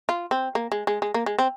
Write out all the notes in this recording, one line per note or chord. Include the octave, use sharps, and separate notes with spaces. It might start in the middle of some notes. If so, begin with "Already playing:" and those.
F4
C4
A#3
G#3
G#3
G#3
A#3
G#3
C4